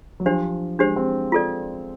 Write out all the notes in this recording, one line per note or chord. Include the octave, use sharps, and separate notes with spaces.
F#3
F3 D4 G4 C5
G#3 D4 G4 C5
C4
F4 A4 D5